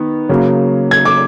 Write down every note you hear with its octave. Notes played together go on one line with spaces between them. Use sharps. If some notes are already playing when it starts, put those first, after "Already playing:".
Already playing: D#3 B3
C#3 F#3 A#3
G#6
D6